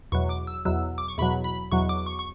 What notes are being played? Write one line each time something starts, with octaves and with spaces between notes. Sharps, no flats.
E2 B2 F#3 C#6
D6
E6
E2 B2 F#3 E6
D6
C#6
E2 B2 F#3 B5
B5
E2 B2 F#3 C#6
D6
C#6
C#6